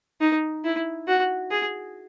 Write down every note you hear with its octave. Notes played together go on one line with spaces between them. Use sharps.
D#4
E4
F#4
G#4